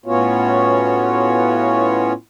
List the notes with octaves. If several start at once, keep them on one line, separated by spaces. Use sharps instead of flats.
A2 B3 C#4 F4 F#4 C#5